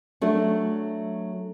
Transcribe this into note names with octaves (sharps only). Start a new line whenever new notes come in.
F#3 A3 D4